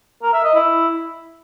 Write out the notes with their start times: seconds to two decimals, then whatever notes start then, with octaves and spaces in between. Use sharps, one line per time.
0.23 A#4
0.34 E5
0.44 D#5
0.55 E4